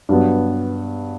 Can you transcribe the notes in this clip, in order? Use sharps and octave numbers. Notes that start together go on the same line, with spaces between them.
G2 F#3 B3